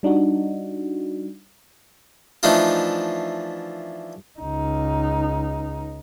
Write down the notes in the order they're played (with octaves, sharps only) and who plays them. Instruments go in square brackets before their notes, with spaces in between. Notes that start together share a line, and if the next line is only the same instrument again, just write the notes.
[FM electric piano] G3 D4 D#4 F#4
[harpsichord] E3 F3 A3 D4 D#4 F4
[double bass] C#2 D#4